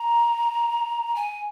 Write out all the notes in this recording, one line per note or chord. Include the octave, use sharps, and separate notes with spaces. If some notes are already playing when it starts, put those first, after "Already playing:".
Already playing: A#5
G#5